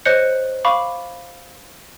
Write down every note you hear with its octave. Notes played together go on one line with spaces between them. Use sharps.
C5 C#5 D#5 F#6 G6 C#7
F5 B5 C#6 D6